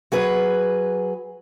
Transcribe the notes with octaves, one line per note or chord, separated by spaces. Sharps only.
F#3 G#4 B4